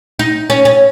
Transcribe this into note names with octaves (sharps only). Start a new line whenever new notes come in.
D#4
C#4
C#4